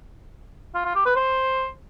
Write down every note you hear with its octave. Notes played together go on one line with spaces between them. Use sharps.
F4
F4
G4
B4
C5